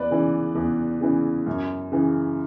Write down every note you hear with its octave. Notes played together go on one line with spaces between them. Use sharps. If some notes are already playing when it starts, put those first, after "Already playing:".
Already playing: E2 B4 D5
C#3 E3
E2
C#3 E3
F#2
C#3 E3